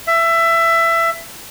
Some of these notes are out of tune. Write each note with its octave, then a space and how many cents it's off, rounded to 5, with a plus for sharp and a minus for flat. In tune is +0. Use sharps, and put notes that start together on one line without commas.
E5 +20